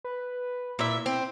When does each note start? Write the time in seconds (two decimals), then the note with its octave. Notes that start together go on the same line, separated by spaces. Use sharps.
0.04 B4
0.79 A#2 E4 E5
1.06 C4